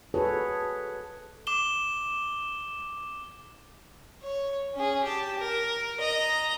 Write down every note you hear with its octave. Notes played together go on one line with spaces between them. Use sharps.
F#4 G#4 A4 B4 C#5
D6 E7 G7
C#5
C#4 G#4
G4 A5
A#4
D#5 A#5